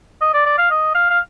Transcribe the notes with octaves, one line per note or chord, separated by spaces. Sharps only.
D#5
D5
D5
F5
D#5
F5
F5